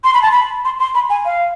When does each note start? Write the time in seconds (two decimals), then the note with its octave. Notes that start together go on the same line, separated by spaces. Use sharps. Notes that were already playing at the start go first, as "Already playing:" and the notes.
0.04 C6
0.14 B5
0.22 A5
0.32 B5
0.65 C6
0.80 C6
0.95 B5
1.10 G#5
1.25 F5